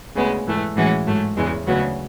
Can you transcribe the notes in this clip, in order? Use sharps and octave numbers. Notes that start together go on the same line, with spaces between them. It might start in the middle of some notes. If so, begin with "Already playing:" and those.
D2 C#3 G#3 B3
G#2 E3 A3
A2 E3 G#3 C#4 F#4
G#2 F#3 A3
E2 C#3 E3 G#3
D2 C#3 F#3 B3 F#4